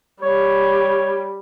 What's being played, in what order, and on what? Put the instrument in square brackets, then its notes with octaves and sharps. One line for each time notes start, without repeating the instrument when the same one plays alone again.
[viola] G3 [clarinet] C#5